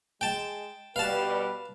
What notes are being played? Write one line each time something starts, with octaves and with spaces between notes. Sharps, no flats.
G#3 G5 A5
B2 G3 B4 F5 A5